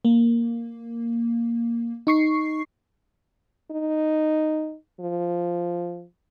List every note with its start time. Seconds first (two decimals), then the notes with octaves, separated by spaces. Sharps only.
0.05 A#3
2.07 D#4 C#6 C7
3.71 D#4
5.01 F3